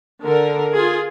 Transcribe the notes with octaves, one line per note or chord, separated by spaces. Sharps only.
D3 A#4
F4 G#4